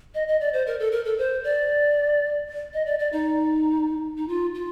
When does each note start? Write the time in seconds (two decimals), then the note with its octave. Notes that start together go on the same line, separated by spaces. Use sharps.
0.15 D#5
0.28 D#5
0.41 D5
0.53 C5
0.67 A#4
0.80 A4
0.92 A#4
1.05 A4
1.19 C5
1.44 D5
2.74 D#5
2.86 D5
2.99 D5
3.12 D#4
4.18 D#4
4.28 F4
4.55 F4